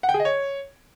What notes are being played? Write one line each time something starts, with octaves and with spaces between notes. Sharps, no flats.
F#5
G5
G#4
D#5
C#5